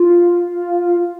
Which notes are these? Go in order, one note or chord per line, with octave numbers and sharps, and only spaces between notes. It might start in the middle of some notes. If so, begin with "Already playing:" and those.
Already playing: F4